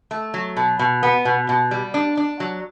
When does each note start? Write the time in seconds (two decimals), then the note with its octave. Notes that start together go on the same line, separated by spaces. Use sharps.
0.11 A3
0.34 F#3
0.56 B2
0.79 B2
1.03 B3
1.25 B2
1.49 B2
1.71 G3
1.94 D4
2.17 D4
2.40 F#3